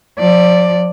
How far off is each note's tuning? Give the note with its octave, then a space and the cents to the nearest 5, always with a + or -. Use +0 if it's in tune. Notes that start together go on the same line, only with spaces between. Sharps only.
F3 +35 D5 +0